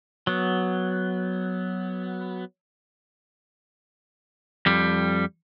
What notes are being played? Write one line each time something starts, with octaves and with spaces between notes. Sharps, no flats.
F#3 B3
F2 G3